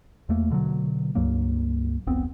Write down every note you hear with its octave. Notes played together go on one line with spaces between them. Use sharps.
E2 A3 A#3
B2 D3 E3 F#3
C#2 G2 F#3 A#3
F1 C2 B3 C4